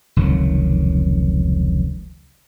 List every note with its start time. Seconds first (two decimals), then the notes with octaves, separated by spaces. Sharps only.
0.16 F1 C#2 D#3 F#3